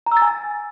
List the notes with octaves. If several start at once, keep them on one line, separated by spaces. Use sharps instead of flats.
A#5
E6
A6
G#5